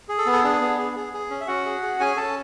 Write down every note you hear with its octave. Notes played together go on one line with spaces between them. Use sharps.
G#4
A4
B3
A4
D4 G#4
B3
G#4
G#4
G#4
C#4
E5
C#4 F#4 F#5
G#4
G#4
C#4 G#4 G#5
C#4 A4 A5